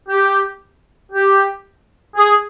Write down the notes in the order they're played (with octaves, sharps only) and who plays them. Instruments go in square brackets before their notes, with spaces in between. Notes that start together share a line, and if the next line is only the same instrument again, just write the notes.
[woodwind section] G4
G4
G#4